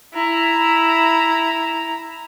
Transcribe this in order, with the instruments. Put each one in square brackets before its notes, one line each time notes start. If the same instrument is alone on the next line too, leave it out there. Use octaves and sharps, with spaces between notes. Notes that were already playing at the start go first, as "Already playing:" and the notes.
[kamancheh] E4 A#5